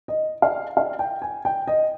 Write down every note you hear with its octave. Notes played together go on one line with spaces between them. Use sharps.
D#5
F5
F5
G5
G#5
G5
D#5